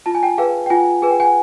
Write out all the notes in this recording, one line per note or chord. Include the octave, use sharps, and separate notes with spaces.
F4 A5
G#5
G5 A5
G#4 B4 F5 G5
G5
F4 F#5 G#5
G#4 B4 G#5
G5
F#5 G#5